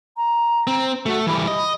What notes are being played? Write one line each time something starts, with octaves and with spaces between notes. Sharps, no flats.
A#5
C4
A3 F#4
E3 G3 B5
D#5